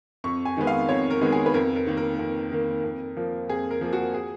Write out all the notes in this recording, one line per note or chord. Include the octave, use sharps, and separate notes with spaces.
F2 C#6
G#5
D#3 G#3 B3
F5
F2 C#5
A#4
D#3 G#3 B3
G#4
B4
F2 A#4
A#4
D#3 A#3
A#4
F2
D#3 A#3
F2
F3 A#3
F2 G#4
A#4
F3 A#3
F#4
G#4